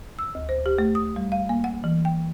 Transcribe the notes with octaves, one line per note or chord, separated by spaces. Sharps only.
E6
D2
C5
G4
A3
D#6
G3
F5
A#3
F#5
E3
G5